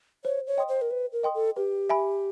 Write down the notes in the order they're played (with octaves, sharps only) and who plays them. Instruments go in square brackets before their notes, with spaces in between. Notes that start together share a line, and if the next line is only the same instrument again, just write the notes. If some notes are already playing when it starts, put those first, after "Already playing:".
[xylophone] C5 [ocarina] C#5
[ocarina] C#5
[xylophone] D#5 G5 C6 D#6
[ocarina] C5
A#4
[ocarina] B4 [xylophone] C5
[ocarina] A#4
[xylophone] D#5 G5 C6 D#6
[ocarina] A4
[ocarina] G4 [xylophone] B4
[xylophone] E5 G#5 B5